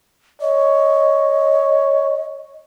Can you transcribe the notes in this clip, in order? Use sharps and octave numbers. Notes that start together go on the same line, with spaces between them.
C#5 D#5